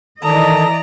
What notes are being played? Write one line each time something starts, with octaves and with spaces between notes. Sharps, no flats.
D#3 E3 A4 D5 D#5 A5 A#5 D#6